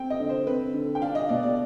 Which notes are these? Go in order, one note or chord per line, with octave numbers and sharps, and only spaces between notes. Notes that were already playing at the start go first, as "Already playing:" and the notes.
Already playing: C4 G5
D#5
D3
C5
C4 B4
D3
G5
D4 F5
D#5
B2 D5
D5